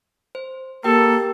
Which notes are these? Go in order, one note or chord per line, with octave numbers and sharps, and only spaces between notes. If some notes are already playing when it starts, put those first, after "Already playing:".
C5
A#3 G4 A4 A#4 G5